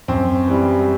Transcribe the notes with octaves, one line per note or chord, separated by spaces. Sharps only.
F#2 C4
E3 G3